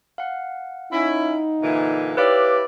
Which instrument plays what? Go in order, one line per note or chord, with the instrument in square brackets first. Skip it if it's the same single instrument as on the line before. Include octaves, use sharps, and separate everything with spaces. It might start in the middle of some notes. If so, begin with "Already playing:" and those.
[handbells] F5 F#5
[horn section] C#4 E4 [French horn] D#4
[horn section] A#2 D3 E3
[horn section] E4 G4 D5 [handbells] B4 C#5 F5